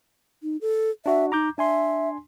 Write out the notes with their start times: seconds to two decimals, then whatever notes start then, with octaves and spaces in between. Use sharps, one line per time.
0.43 D#4
0.61 A4
1.06 D4 F#4 E5
1.32 D#4 A#5 D6 G6
1.58 D4 E5 G#5 C6